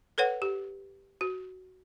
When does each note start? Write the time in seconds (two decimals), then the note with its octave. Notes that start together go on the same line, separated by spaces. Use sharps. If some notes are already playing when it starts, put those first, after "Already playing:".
0.18 A4 B4 C#5 F#5
0.42 G4
1.21 F#4